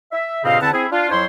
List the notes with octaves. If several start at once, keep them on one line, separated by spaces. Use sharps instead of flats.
E5
G2 A#2 C#3 C4 D#5 F5
E2 D3 C4 E4 F#5 A5
C4 E4 G#4
D4 F4
F2 F#3 E4 C5 C#5 C6